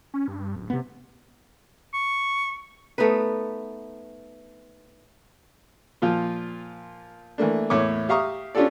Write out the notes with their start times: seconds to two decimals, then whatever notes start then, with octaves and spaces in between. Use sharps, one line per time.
0.14 C#4
0.28 G2
0.56 D1
0.70 C3 B3
1.94 C#6
2.98 A3 B3 D#4 B4
6.02 A#2 F3 F4
7.38 E3 A3 A#3 D4
7.70 E2 A2 A#3 C#5 D6
8.09 G4 E5 F5 A#5 C#6 D#6
8.55 C#4 D4 F4 G4 A4 D5